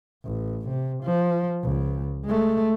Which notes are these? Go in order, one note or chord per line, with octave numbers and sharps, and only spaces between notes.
A1
C3
F3
C#2
G#3 A3